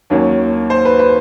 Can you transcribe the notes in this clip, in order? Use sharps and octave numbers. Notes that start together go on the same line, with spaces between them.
D#2 D#3 F#3 A#3 C#4
C5
B4
B4